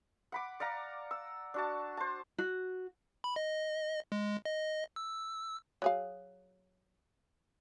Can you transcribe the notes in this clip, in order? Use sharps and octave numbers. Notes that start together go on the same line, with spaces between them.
F#5 B5 D6
D5 F5 F#5 A#5
E6
D4 F#4 A5
C5 A5
F#4
B5
D#5
G#3
D#5
E6
F#3 G#4 F5